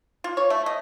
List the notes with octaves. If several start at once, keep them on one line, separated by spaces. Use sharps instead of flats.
F4
C#5
A3
D#5